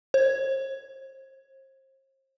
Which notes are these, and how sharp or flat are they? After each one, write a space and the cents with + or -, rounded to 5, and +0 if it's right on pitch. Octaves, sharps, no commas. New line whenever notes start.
C5 +40